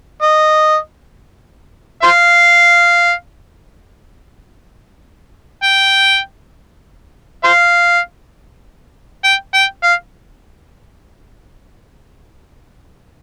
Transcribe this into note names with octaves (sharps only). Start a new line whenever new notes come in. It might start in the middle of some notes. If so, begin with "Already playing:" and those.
D#5
C5 F5
G5
C5 F5
G5
G5
F5